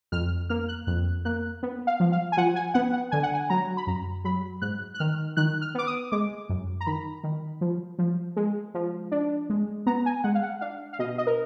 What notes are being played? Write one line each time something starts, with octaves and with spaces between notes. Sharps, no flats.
F2 F6
A#3 F6
F#6
F2 F#6
A#3 F#6
B3
F5
F3
F5
G#5
F3 F#5
G#5
B3 F#5
F#5
D3 G#5
F#5
G#5
F#3 A#5
B5
F#2 A#5
F#3 B5
G#2 F#6
F#6
D#3 F6
D#3 F#6
F6
B3 D6
D#6
G#3 D6
F#2
A#5
D#3 B5
D#3
F3
F3
G#3
F3
D4
G#3
B3 A#5
G#5
G#3 F#5
F5
F#5
D4 F5
F5
B2 D#5
D#5
A#4